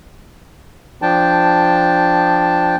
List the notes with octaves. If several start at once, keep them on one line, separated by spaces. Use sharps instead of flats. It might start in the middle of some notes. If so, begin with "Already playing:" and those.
F3 D4 G5 A5